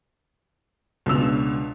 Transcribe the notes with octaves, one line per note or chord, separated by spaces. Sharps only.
C#2 B2 D4 E6 F7